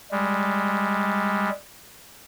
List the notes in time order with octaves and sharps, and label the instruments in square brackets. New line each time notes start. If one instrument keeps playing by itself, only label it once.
[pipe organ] G3 G#3